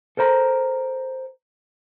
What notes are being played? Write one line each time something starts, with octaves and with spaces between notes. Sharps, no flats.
A4 A#4 C5 A#5